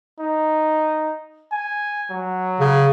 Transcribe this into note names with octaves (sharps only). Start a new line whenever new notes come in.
D#4
G#5
F#3
C#3